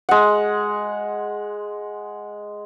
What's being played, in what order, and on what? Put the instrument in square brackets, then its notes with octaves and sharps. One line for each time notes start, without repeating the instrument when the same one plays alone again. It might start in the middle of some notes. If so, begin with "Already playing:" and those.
[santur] G#3 F#5